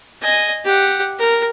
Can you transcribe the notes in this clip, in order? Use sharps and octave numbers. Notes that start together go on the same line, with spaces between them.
D#5 G#5
G4 F#5
A#4